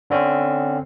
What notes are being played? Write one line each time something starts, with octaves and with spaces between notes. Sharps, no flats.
D3 C4 C#4